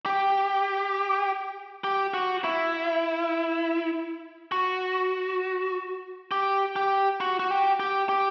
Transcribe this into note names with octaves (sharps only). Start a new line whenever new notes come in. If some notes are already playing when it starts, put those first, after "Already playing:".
G4
G4
F#4
E4
F#4
G4
G4
F#4
F#4
G4
G4
G4